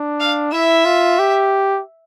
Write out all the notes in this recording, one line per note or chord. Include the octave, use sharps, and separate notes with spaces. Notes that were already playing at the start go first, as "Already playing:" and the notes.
Already playing: D4
F5
E4 E5
F4
G4